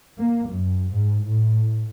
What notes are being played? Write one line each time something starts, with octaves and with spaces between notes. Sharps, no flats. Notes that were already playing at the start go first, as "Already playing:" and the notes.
A#3
F#2
G#2
A2